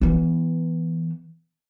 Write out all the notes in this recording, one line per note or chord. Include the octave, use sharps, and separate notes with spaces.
E3 B3